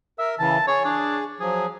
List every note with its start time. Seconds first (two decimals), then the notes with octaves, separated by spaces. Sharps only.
0.19 A#4 E5
0.39 C#3 E3 A5
0.68 G#4 C#5
0.85 D4
1.40 F3 F#3 G#4